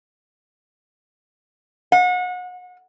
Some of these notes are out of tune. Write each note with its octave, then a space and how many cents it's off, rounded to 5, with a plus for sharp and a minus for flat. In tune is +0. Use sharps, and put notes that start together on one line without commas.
F#5 -35